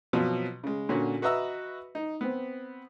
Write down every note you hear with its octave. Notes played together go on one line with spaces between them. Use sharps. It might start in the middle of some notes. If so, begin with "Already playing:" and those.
B2 F3 F#3 B3 C4
C#3 G#3
A#2 D3 C#4 F#4
F#4 B4 D#5 E5 A#5 E6
D#4
B3 C4